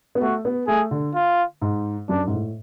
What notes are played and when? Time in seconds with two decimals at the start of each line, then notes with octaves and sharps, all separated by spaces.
0.15 B3
0.21 A3 F#4
0.45 B3
0.67 A3 G#4
0.91 D3
1.15 F4
1.62 G#2
2.09 F#2 D4
2.27 G#2
2.33 A2